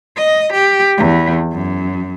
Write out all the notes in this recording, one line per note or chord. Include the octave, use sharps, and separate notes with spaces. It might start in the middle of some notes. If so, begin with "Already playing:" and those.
D#5
G4
E2
F#2